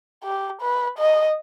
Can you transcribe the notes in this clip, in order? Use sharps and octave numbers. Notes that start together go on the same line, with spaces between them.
G4
B4
D#5